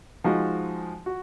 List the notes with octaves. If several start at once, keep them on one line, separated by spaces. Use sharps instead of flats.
F3 G#3 D#4 F#4
F#4